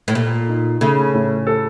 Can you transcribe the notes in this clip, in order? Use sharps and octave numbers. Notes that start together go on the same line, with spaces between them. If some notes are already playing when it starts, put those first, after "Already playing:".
A2
A#2 A4
D#4
C#3 A3
A2
A4